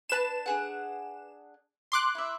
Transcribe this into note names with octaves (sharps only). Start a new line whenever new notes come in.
D4 B4 A5 E7
D4 G#4 F#5
C6 D6 F#6
E4 E5